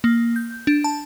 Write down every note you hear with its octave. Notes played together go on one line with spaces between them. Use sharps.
A#3
G6
D4
A5